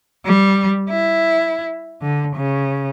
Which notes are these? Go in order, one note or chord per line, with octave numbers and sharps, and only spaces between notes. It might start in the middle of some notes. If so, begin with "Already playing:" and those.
G3
E4
D3
C#3